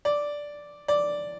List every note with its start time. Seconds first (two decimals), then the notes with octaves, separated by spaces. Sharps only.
0.05 D5
0.88 D5